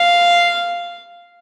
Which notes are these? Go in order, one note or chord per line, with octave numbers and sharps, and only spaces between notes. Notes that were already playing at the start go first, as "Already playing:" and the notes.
Already playing: F5